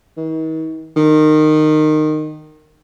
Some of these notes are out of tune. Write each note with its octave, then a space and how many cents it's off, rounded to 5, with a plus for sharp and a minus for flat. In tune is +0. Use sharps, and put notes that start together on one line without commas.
D#3 +45
D#3 -20